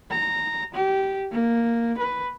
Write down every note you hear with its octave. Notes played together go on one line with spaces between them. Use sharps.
A#5
G4
A#3
B4